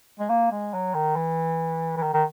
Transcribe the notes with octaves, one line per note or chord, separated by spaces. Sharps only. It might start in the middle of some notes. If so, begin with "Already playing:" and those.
G#3
A#3
G#3
F#3
D#3
E3
E3
D#3
D#3